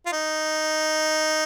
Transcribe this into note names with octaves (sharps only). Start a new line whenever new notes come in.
F4
D#4